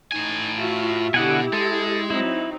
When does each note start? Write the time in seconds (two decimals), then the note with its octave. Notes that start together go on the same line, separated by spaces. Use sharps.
0.12 A2 D#4 G#5
0.57 F4 F#4 E5
1.14 B2 D3 E4 G4 F#5 G#5
1.53 G#3 A4
2.10 F#3 C4 D#4 E4